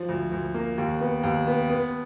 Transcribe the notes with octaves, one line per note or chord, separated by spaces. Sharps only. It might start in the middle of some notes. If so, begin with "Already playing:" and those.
Already playing: F3
D2
D2
A#3
D#2
B3
D#2
B3
B3